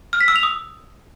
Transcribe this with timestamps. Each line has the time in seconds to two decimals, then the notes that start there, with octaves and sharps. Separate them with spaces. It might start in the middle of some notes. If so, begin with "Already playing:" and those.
0.13 F6
0.21 B6
0.28 E6
0.36 F7
0.43 D#6